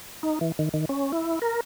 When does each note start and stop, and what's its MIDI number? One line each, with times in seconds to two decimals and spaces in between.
0.23 0.39 63
0.41 0.52 52
0.59 0.69 51
0.74 0.85 51
0.89 1.12 61
1.12 1.39 64
1.42 1.60 70